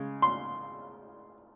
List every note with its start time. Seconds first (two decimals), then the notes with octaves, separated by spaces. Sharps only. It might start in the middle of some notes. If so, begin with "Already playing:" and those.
Already playing: C#3 G#3
0.22 C6